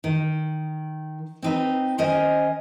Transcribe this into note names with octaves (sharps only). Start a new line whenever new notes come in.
D#3
C4 D#4 B4
D#3 C#4 A#4 C5 D#5